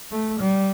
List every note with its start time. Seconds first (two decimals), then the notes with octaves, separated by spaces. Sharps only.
0.11 A3
0.39 G3